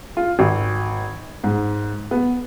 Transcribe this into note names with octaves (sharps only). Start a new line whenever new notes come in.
F4
G#1
G#2
B3